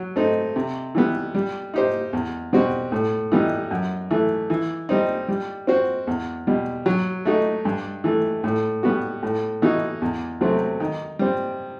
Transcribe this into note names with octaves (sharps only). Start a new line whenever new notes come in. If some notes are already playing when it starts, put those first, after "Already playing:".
Already playing: F#3
A3 C4 D#4
C3
E3 G3 B3
G3
D#4 G4 C5
E2
B2 G3 C4 F#4
A2
E3 G3 B3 D#4
F#2
E3 A3
E3
G3 C4 D#4
G3
C4 F#4 C5
E2
B2 G3
F#3
A3 D#4 F#4
G2
E3 A3
A2
G3 B3 F#4
A2
E3 B3 D#4 F#4
E2
C3 F#3 A3 C4
D#3
G3 C4